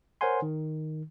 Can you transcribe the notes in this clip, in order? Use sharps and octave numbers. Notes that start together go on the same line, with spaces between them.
A#4 C5 C#5 F#5 G#5 C6
D#3